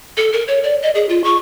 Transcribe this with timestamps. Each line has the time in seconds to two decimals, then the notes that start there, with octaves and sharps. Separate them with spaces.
0.17 A4
0.33 A#4
0.48 C#5
0.64 D5
0.82 D#5
0.95 G#4
1.09 F4
1.24 C#6